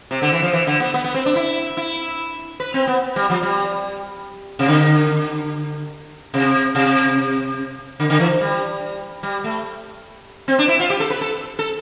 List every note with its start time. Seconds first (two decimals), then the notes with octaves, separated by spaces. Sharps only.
0.11 C3
0.22 D3
0.32 E3
0.43 F3
0.53 E3
0.67 D3
0.80 B3
0.94 B3
1.04 B3
1.14 C4
1.26 D4
1.36 E4
1.77 E4
2.60 B4
2.74 C4
2.87 B3
3.16 G3
3.30 F3
3.43 G3
4.59 C3
4.68 D3
6.34 C3
6.75 C3
8.00 D3
8.10 D3
8.20 E3
8.41 G3
9.23 G3
9.44 A3
10.48 C4
10.59 D4
10.68 E4
10.80 F4
10.90 G4
11.00 A4
11.10 B4
11.21 A4
11.59 A4